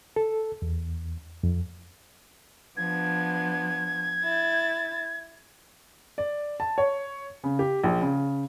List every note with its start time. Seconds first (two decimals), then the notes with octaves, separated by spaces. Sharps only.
0.16 A4
0.62 E2
1.43 F2
2.77 F3 B3 D4 G#6
4.23 E4 A6
6.18 D5
6.60 A5
6.78 C#5
7.44 C#3
7.59 G4
7.83 A#1
8.02 C#3